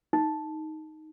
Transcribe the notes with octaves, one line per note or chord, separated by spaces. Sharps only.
D#4